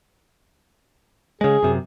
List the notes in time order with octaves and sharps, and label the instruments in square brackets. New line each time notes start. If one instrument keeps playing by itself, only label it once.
[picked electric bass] C#3 G#3 [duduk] G#4
[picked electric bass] F#2 C3